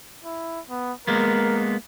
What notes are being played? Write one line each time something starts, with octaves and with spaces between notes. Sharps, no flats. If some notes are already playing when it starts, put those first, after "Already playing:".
E4
B3
G#3 A#3 B3 A#4